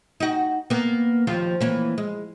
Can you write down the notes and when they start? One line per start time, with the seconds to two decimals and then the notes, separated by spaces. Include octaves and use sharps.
0.20 D#4 F#4
0.70 A#3 B3
1.27 D#2 F3 F4
1.61 E3 A#3 C#4
1.98 G#3